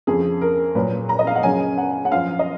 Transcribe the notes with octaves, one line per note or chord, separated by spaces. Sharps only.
F2 C#3 F3 G#4
A#4
A#2 F#3 B4
A#5
D#5
F5
F#5
F#2 C#3 F#3 G#5
F#5
F#5
F#2 F3 F5
D#5